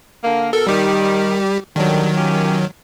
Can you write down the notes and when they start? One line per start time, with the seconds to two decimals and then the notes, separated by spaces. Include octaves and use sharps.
0.23 D3 A#3
0.53 B2 A4 A#4
0.67 D#3 G3 G4
1.76 D3 D#3 F#3 G3
2.16 C#4 F4 G4